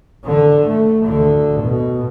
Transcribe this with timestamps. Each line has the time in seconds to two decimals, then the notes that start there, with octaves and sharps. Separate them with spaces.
0.25 D3
0.68 A3
1.06 D2 D3
1.61 B2